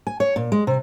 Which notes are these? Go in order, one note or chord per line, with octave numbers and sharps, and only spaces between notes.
G#5
C#5
A#2
G#3
C3